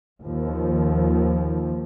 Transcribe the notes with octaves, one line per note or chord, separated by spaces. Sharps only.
D#2 F3